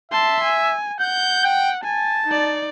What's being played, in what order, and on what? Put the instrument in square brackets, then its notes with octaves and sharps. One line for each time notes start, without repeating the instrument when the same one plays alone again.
[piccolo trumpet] E5 [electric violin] A5 C6
[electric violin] G#5
[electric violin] F#5 [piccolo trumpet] G6
[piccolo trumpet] G5
[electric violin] G#5 [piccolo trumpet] A5
[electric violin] D#4 D5